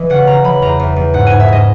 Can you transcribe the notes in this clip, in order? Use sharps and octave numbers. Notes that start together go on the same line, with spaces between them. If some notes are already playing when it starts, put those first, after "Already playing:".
Already playing: E3 D#5
C#3 F#5
C#3 A#5
E3 B5
E2 A#5
E2
E2
G#2 F#5
G#2 G#5
E5
G#2 D#5